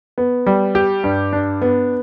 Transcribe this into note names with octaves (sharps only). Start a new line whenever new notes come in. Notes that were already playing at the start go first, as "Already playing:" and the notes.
B3
G3
G4
G2
D4
B3